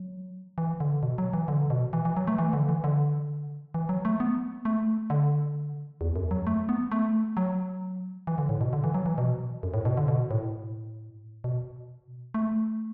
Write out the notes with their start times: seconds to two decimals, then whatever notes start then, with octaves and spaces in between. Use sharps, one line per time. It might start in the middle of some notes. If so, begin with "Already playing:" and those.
Already playing: F#3
0.58 E3
0.80 D3
1.03 B2
1.18 F#3
1.33 E3
1.48 D3
1.70 B2
1.93 E3
2.05 E3
2.17 F#3
2.27 A3
2.39 E3
2.53 D3
2.69 E3
2.84 D3
3.74 E3
3.89 F#3
4.05 A3
4.20 B3
4.65 A3
5.10 D3
6.01 E2
6.16 F#2
6.31 F#3
6.47 A3
6.69 B3
6.92 A3
7.37 F#3
8.27 E3
8.38 D3
8.49 A2
8.61 B2
8.73 D3
8.84 E3
8.94 F#3
9.06 E3
9.18 B2
9.63 F#2
9.74 A2
9.85 B2
9.97 D3
10.08 B2
10.31 A2
11.44 B2
12.34 A3